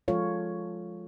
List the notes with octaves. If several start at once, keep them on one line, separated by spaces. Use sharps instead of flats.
F3 G#3 F4 A4 C#5 F5